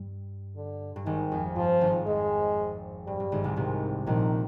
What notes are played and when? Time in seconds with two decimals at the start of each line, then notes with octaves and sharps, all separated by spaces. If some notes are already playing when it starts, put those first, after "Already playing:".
Already playing: G2
0.56 D3
0.96 G2
1.05 G#1 G#2 D#3
1.32 F2
1.56 G2 F3
1.81 G#1 G#2
2.06 F2 G#3
3.07 G2 G3
3.20 G2
3.32 G#1 G#2
3.44 C2 C3
3.56 C2 C3 D#3
4.06 A#1 A#2 D#3